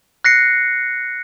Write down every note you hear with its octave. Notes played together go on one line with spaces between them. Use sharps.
F#6 A#6 C7 C#7